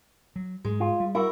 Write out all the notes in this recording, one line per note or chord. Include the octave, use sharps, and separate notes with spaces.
F#3
G#2 G#3
F4
G3
E4 F#4 A#4